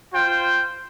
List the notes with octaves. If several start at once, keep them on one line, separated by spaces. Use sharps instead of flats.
F4 C5 G5